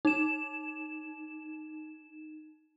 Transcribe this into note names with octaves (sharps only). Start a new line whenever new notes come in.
D#4 E7